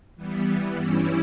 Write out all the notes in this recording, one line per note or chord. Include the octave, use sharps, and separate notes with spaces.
E3 G3 B3
G2 E3 G3 C#4 E4